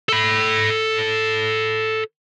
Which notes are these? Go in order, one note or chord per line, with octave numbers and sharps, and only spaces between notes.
A4 B5